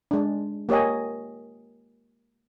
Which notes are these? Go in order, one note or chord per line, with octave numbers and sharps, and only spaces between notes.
G#3 D4
A#3 G4 C#5 D#5 G#5